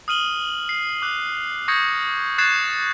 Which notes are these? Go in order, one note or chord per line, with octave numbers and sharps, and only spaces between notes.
D#6 F6 D#7 F#7 G7
C7
D6 F#6
C#6 D#6 G6 G#6 A#6 C#7
C#6 F#6 G#6 A6 C7 E7